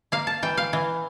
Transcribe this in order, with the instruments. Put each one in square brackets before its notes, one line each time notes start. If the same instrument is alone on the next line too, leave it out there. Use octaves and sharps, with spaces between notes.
[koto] A#3 F5
A5
E3 G5
F5
E3